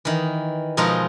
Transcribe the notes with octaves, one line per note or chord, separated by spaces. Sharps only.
D#3 E3
B2 F3 G#3 D#4 F4 A#4